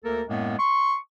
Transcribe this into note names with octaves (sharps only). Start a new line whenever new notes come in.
D2 A#3 A4 A#4
F#2 A2 G#3 A#3 B3
C6 C#6